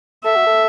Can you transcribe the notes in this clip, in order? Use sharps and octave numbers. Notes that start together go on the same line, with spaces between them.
A4 E5
F#4
A4